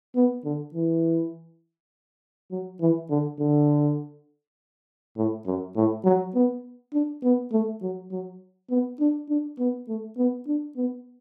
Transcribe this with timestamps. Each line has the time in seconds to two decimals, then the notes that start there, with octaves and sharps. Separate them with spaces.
0.15 B3
0.45 D3
0.74 E3
2.51 F#3
2.80 E3
3.10 D3
3.40 D3
5.17 A2
5.46 F#2
5.76 A2
6.05 F#3
6.35 B3
6.93 D4
7.23 B3
7.52 A3
7.82 F#3
8.11 F#3
8.70 B3
9.00 D4
9.29 D4
9.59 B3
9.88 A3
10.17 B3
10.47 D4
10.77 B3